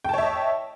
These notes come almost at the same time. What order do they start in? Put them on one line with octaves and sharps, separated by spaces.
G5 A5 C#5 E5 D#5